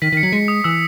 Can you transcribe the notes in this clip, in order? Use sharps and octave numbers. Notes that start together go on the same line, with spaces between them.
D#3 B6
D#3
C#7
F#3
G#3 C#7
D#6
E3 E6